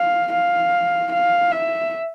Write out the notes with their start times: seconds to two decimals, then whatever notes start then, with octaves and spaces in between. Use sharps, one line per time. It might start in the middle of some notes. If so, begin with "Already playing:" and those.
Already playing: F5
0.33 F5
1.13 F5
1.51 E5